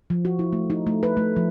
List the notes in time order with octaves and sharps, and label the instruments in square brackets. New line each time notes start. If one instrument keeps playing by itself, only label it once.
[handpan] F3
F#4
E4
A3
D#4
A3
B4
A3
F3